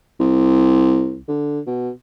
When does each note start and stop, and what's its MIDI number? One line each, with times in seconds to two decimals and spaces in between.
0.20 1.20 36
1.28 1.60 50
1.67 1.90 47